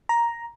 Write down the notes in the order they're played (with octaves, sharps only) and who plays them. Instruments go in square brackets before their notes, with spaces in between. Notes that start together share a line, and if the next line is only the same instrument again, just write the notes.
[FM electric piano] A#5